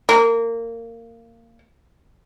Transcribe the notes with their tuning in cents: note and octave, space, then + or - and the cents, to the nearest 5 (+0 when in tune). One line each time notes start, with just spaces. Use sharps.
A#3 -20